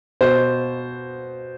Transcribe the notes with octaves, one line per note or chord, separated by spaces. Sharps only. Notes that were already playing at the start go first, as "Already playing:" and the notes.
B2 C5